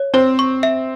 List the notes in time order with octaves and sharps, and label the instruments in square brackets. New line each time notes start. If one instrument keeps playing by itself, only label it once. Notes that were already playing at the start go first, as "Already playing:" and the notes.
Already playing: [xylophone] C#5
[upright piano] C4 [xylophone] C5
[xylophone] C#6
E5